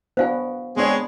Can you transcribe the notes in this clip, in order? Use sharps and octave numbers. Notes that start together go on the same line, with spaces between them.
B3 D4 F#4 C5 F5 G#5
G#3 B3 C4 D4 G#4 C#5